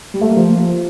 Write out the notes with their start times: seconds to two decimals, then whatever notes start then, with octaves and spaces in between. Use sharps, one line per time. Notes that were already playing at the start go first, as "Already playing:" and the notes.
0.14 G3
0.21 A3
0.29 A#3
0.37 F3